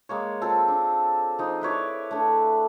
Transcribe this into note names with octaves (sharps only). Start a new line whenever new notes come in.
G#3 A#3 C#5
C4 F4 A4 A5
D4
F3 D#4
E4 B4 C#5 D5
A3 D4